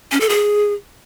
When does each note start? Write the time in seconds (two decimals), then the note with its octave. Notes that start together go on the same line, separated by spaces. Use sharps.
0.12 C#4
0.20 A4
0.29 G#4